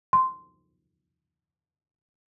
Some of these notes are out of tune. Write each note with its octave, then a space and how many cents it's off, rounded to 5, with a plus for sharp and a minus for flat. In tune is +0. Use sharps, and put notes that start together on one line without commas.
C6 -10